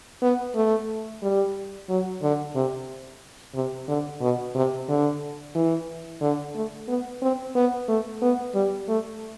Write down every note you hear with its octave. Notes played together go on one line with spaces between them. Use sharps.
B3
A3
G3
F#3
D3
C3
C3
D3
B2
C3
D3
E3
D3
A3
B3
C4
B3
A3
B3
G3
A3